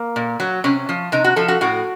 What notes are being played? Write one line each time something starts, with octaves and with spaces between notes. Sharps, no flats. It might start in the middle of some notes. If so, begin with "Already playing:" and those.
Already playing: A#3
A#2
F#3
C3 C#4
F3
C3 D#4
F#4
F3 A4
F#4
A2 F#4